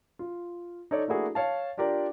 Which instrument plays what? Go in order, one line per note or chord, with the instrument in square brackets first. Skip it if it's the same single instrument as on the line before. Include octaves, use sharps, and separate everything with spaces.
[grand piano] F4
D#4 A4 C#5 D5
A3 A#3 D4 E4 F#4 G#4
C#5 F5 A5
D4 F4 G4 A#4 D5